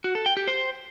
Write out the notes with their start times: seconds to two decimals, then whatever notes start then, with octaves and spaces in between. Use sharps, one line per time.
0.04 F#4
0.15 A4
0.26 G5
0.37 G4
0.47 C5